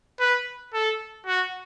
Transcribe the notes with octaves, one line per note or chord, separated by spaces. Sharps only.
B4
A4
F#4